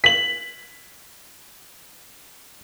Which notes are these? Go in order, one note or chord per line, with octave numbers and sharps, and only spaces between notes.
B6 F#7